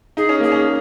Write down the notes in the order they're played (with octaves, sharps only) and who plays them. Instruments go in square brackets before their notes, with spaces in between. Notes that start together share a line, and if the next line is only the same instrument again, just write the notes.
[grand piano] D#4 [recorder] G#4
[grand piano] C#4
[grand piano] A#3 [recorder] G#4
[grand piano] C#4